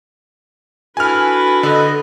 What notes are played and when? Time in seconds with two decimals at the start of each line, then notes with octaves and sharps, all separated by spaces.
0.97 D4 E4 F#4 A4 B4 G#5 F6
1.63 D3 A4 D#5